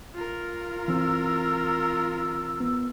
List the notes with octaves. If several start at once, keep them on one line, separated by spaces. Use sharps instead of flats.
F4 A#4
E3 C4 E6
B3